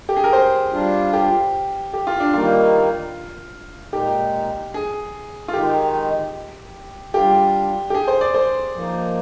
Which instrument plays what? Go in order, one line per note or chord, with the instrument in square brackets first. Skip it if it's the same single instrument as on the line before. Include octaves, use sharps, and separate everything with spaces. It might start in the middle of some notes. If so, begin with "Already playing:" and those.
[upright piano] G4
G#4
A#4
C5
[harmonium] G3 D4 F4
[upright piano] G4
G4
F4
D4
[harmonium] D#3 G3 A#3 D#4 [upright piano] F4
[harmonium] A#2 G#3 D#4 [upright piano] G4
[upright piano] G#4
F4
[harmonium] D#3 G#3 D#4 [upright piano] G4
[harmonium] G3 D4 F4 [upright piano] G4
[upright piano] G4
G#4
C5
D5
C5
[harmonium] F3 A#3 D#4